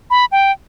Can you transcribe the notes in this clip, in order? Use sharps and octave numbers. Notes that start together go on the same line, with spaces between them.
B5
G5